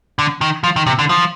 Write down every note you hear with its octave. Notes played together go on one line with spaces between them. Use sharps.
D3
D#3
F3
D#3
C3
D3
F3